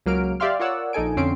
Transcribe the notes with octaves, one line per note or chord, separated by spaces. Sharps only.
C#2 F#3 A#3 F6 D7
G4 D5 E5 F5 C6 F6
F4 A#4 C#5 D5 F#5 E6
A#1 D#4 A4 G#5 D7
F2 D3 C4 C#4 C7 D7